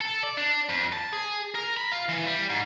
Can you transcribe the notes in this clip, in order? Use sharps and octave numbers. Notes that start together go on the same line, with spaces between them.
A4
D5
D4
F2
A5
G#4
A#4
B5
F4
E3
G3
G#2